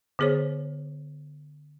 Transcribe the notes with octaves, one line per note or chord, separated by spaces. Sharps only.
D3 B3 G#4 C5 C#5